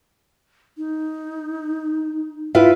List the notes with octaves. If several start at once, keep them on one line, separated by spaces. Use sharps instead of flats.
D#4
E4 F4 B4